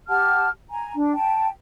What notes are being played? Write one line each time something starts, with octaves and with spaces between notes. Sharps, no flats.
G4 F#5 A5 F6
G#5 A#5
D4
G5 A5